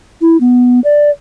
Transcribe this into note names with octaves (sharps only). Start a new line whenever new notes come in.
E4
B3
D5